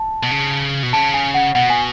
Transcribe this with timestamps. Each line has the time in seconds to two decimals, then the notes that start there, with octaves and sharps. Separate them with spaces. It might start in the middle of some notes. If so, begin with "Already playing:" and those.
Already playing: A5
0.23 B2
0.31 C#3
0.83 B2
0.93 C#3 A5
1.14 G#5
1.34 F#5
1.55 B2 F#5
1.70 G#5